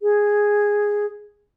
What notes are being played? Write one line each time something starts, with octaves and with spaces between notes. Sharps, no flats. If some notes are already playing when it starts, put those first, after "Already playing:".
G#4